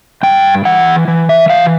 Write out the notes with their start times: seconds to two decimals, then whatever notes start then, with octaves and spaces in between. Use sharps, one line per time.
0.23 G2 G5
0.65 E3 F#5
1.08 E3
1.29 E5
1.50 E3 F5